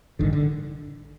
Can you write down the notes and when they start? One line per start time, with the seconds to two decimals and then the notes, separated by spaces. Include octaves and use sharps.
0.19 A1 G2 D3 D#3
0.33 D3